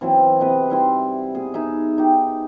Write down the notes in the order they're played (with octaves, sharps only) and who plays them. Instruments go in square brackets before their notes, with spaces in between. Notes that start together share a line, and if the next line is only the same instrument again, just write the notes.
[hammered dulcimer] E3 F#3 C4 E4
C3 B4 D#5
G3 E4 C6
B2 G#4
D#4 G#4 E5
D#4 G4